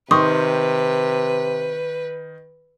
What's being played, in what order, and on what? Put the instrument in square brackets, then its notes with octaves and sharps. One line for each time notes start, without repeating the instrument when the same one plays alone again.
[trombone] C3 [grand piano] D#3 [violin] B4 [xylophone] C6 C#6 D#6